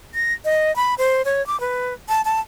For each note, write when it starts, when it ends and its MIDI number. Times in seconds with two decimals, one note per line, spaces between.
0.14 0.33 94
0.45 0.74 75
0.76 0.94 83
0.98 1.22 72
1.25 1.45 73
1.47 1.59 86
1.60 1.93 71
2.09 2.21 81
2.25 2.40 81